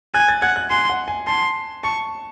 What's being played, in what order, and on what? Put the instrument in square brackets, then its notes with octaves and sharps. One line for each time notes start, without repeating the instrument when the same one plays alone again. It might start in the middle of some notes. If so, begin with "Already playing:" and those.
[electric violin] G#5 [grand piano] F#6
[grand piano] A6
[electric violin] F#5 [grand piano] G#6
[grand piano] F#6
[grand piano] G#5 [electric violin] C6
[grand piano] F#5
G#5
[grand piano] A5 [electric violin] C6
[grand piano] A5 [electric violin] C#6